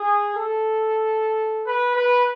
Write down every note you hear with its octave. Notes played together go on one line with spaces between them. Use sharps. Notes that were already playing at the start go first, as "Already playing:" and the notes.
Already playing: G#4
A4
B4
B4